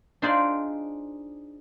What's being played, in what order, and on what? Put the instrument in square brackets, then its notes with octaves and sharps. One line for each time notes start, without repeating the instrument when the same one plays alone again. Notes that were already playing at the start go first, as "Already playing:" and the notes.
[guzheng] D4 D#4 F4 G#4 C5 D5